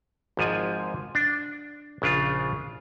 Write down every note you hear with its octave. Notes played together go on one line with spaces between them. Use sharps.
G#1 G#2 F3 G#5
D4
A#1 C#3 D4 F4